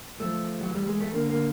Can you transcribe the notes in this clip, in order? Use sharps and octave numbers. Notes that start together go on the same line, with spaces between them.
F3 A3
F#3
E3
G3
G#3
A3
D3 A#3
A#3